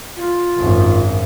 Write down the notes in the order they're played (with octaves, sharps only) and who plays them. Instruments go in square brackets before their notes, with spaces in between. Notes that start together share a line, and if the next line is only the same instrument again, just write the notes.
[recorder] F4
[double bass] G#1 F#2